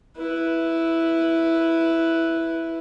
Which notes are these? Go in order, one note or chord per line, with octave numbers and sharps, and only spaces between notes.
E4 B4